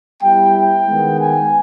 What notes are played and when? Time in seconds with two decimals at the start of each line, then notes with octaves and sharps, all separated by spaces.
0.22 G3 B3 E4 G5
0.54 G5
0.86 D#3 G#3 B3
1.19 G#5